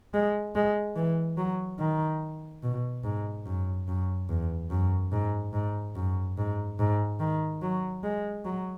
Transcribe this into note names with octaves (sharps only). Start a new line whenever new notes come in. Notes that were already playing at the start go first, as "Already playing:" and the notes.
G#3
G#3
E3
F#3
D#3
B2
G#2
F#2
F#2
E2
F#2
G#2
G#2
F#2
G#2
G#2
D#3
F#3
G#3
F#3